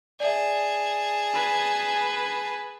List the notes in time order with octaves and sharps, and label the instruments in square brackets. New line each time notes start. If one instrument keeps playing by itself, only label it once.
[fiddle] G#4 A5 [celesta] D5 E5
[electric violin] B4 G#5